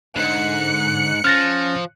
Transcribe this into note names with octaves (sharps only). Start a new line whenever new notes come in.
C#2 G#2 D3 F#6 C#7
F3 C#4 F6 A6 A#6